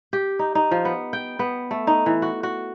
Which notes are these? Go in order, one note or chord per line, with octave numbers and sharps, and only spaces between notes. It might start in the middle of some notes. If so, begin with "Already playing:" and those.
G4
D#4
D#4
F3
B3
G5
B3
A3
D#4
E3
F#4
F#4